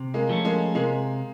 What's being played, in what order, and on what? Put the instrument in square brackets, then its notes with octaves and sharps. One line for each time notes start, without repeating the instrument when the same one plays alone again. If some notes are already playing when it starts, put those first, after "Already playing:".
Already playing: [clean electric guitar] C3
[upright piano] G#3 A#3
[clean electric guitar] F3 A3 C#4
[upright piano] G#3 A#3
[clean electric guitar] C3 [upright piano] G#3 A#3